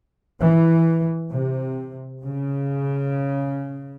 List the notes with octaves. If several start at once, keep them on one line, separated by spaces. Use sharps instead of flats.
E3
C3
C#3